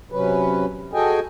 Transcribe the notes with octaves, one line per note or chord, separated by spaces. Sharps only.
C3 F#3 C#4 B4
F#4 G#4 A4 D#5 G5 G#5